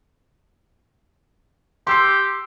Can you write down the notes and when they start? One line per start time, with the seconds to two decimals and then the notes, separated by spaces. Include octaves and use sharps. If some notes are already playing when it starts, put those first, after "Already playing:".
1.87 G4 C6 E6 C7